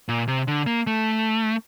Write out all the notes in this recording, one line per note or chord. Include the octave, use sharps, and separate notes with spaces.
A#2
C3
D3
A#3
A3